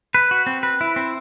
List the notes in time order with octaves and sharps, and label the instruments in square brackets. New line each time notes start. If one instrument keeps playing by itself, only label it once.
[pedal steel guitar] B4
F#4
C4
B4
E4
C4